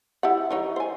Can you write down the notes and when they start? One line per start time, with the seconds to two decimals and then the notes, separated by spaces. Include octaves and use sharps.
0.23 E4 G4 F#5
0.51 E3 D#4 C#5
0.76 C5 G#5